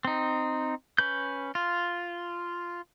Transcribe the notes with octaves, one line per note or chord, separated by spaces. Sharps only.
C4 D#4
C#4 B4 G6
F4